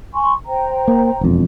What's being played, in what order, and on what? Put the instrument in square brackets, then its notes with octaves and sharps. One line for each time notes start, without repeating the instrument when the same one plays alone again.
[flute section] G#5 C6 C#6
C5 G5 A#5
[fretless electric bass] A#3
E1 F2